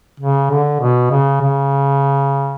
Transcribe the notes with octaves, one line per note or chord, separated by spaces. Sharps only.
C#3
D3
B2
C#3
C#3